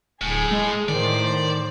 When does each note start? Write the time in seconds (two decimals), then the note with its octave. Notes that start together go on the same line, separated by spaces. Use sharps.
0.21 D1 A2 G#4
0.51 G#3
0.89 A2 D#3 C5 D5